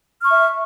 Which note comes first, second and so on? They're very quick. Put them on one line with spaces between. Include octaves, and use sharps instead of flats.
F6 C#6 E5